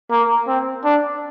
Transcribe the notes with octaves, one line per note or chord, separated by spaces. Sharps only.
A#3
C4
D4